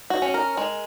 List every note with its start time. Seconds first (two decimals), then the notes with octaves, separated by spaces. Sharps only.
0.10 F#4
0.22 C#4
0.34 A#4
0.57 G#3